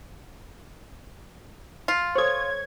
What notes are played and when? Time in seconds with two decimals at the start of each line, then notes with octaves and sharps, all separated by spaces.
1.88 F4
2.15 A4 C5 C#5 G#6